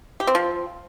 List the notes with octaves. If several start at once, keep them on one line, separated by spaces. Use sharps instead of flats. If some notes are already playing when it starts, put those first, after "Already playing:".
G4
C4
F3